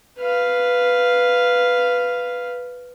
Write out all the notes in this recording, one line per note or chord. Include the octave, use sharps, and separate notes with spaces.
B4 F5